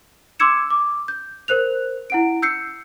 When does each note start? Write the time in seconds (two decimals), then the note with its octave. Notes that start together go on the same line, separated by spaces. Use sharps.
0.39 C6 D6 E6 G#6 C#7 E7
0.70 D6
1.08 G6
1.48 A#4 C5 F#6 F7
2.10 E4 F#5 D7
2.42 E6 G6 C7 C#7